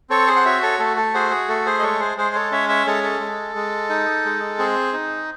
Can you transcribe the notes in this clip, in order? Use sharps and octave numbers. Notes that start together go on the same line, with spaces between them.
C4 A4 C#5
G#4 C5
F#5
F#4 C#5 E5
A4 C#5
A3 A4
A4
F#4 G#4 C5
G#4
A3 A4
G#4 C5
D#5
G#3 A4 C#5
G#4 C5
G#3 G#4 C5
A4 C#5
C#4 C#5 E5
C#5 E5
G#3 A4 C#5
A4
G#3
G#3
D#4
G#3
C4 G#4
D#4